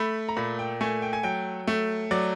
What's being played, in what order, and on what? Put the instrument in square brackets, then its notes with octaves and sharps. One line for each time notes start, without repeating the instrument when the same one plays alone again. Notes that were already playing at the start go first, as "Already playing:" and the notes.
Already playing: [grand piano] A3 B5
A#5
A#2 B5
G5
A3 G#5
G5
G#5
F#3 G5
A3
F#3 D5